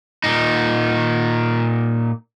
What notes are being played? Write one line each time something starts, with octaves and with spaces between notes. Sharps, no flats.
A#2 D#4